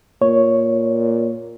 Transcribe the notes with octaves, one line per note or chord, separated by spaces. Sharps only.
A#2 C#5